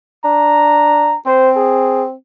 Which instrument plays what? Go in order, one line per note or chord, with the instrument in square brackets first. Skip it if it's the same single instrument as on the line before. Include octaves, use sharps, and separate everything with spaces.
[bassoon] D4 [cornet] A#5
[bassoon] C4 [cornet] C5
[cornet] G#4